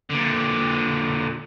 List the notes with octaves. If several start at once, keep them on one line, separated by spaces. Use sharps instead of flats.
A#2 D3